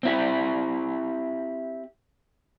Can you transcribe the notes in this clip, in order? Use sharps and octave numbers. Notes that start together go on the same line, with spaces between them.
C4 E4 G4